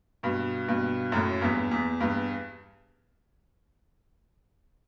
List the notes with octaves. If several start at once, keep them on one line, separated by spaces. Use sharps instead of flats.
G2 B2
G2 B2
F#2 A2
E2 G2
E2
E2 G2